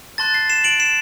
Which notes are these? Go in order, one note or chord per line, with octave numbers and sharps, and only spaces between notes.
A5 C6 F#6 A6
A6 C7
C7 E7
D7 F#7
C7 E7